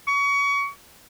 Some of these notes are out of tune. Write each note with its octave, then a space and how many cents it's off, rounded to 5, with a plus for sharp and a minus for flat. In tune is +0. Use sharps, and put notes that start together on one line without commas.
C#6 +30